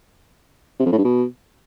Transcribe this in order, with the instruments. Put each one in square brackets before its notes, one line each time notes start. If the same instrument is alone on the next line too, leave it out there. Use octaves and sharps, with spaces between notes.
[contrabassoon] C3
F2
A2
G2
B2